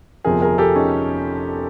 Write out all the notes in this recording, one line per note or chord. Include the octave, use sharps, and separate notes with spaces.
G1 F2 C3 F3 G#4 A#4
G#4 A#4
G4 A4
C#4 D#4